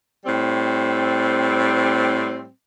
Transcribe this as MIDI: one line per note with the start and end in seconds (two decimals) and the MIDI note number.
0.25 2.48 45
0.25 2.48 55
0.25 2.48 60